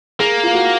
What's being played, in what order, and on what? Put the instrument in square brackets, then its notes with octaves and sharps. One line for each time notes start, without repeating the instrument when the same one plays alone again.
[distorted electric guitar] A#3 [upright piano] G#4
[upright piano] F4
F#4